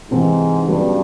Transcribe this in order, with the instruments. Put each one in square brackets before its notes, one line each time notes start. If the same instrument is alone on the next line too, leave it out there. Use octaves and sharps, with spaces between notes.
[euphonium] G#2 [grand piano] C3 E3 G#3 C4 D#4
[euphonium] G2 [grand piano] C#3 F#3 B3 D4 F#4